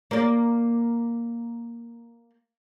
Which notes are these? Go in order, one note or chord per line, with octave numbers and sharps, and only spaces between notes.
A#3 D5